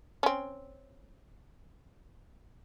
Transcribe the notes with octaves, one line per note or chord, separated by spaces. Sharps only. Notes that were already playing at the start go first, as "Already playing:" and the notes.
C4 C#4